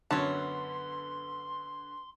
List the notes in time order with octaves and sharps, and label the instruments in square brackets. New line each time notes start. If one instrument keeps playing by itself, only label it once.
[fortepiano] F#2 A5 [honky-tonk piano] D3 [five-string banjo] B3 C#5 [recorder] C6